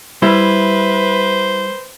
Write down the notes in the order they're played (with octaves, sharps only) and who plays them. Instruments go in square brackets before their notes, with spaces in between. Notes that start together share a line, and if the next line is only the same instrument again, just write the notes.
[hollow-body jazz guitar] G3 [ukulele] E4 [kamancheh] B4 [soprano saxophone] C5